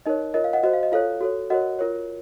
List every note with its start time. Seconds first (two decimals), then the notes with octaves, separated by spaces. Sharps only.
0.06 D#4 A#4 C#5 D#5
0.34 F4 A#4 C#5 D#5
0.44 F5
0.53 D#5 F#5
0.63 F#4 C5 D#5
0.73 F5
0.83 D#5
0.92 F4 A4 C#5 F5
1.20 F#4 A4 C#5
1.50 F#4 A#4 C#5 D#5 F#5
1.79 F4 A#4 C#5